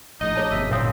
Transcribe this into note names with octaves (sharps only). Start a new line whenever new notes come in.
A#1 A2 D#4 D#5
G#4 C#5 A5
G1 F#2 B2 E5
A#2 C4 C#5 F5 D#6